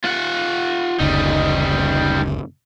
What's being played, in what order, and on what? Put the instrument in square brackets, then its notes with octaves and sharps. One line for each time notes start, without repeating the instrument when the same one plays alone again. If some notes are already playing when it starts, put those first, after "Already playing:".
[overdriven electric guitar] F4 F#5
[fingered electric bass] F#1 D2 C#3 [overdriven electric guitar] G3 D#4